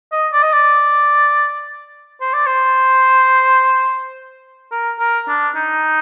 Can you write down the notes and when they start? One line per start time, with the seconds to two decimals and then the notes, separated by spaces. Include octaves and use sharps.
0.12 D#5
0.33 D5
0.43 D#5
0.53 D5
2.21 C5
2.33 D5
2.46 C5
4.72 A#4
5.00 A#4
5.28 D4
5.56 D#4